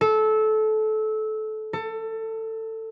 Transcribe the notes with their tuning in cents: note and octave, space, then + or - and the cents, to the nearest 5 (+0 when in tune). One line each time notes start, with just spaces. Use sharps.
A4 -20
A4 +20